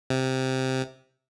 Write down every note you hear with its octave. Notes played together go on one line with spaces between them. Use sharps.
C3